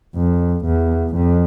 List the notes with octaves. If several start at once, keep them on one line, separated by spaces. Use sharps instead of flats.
F2
E2
F2